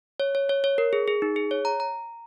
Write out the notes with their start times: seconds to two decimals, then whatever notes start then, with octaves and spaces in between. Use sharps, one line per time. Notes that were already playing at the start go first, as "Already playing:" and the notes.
0.20 C#5
0.35 C#5
0.49 C#5
0.64 C#5
0.78 A#4
0.93 G#4
1.08 G#4
1.22 D#4
1.36 G#4
1.51 C#5
1.65 A#5
1.80 A#5